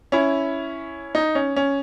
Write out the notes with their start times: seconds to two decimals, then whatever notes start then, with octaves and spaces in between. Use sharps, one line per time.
0.12 C#4 E4
1.15 D#4
1.35 C#4
1.56 C#4